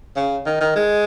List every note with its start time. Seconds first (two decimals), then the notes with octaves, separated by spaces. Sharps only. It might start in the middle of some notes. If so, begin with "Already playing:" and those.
0.16 C#3
0.46 D#3
0.61 D#3
0.76 G#3